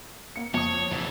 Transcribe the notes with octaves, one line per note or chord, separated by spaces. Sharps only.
A#3 C#7
F2 C#5 D#6
F1 B2 E3